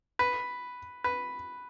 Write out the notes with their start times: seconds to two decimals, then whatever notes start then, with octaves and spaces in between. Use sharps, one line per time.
0.19 B4
1.04 B4